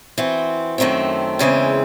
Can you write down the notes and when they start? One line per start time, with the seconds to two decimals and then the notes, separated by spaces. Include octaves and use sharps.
0.18 E3 C4 F#4
0.78 F#2 D#3 A3 C4
1.39 E2 C#3 E3 G#3 C4